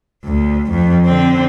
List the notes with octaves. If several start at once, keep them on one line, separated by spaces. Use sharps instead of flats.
D2
F2
D3 C4